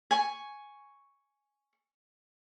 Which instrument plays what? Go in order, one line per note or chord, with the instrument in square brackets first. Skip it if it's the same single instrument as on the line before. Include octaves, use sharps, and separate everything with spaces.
[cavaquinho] G#5 C#6